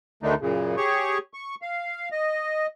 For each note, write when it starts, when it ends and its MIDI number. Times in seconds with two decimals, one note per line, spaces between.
0.23 0.34 38
0.23 0.34 50
0.23 0.34 51
0.23 0.34 57
0.23 0.34 62
0.23 0.34 63
0.41 0.76 42
0.41 0.76 46
0.41 0.76 49
0.77 1.18 67
0.77 1.18 68
0.77 1.18 73
0.77 1.18 85
1.34 1.55 85
1.62 2.09 77
2.12 2.67 75